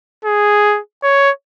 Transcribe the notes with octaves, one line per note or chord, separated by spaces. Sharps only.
G#4
C#5